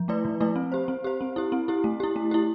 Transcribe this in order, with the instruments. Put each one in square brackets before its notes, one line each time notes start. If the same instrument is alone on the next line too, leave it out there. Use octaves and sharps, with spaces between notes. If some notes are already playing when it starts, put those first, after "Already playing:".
Already playing: [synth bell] F3
A3 E4 B4 D5
F3
A3 E4 B4 D5
C4
G4 C5
C4
G4 C5
C4
E4 G4
C4
E4 G4
A3
E4 G4
A3
E4 G4